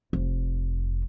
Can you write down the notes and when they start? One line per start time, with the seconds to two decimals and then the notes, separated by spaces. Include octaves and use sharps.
0.13 F1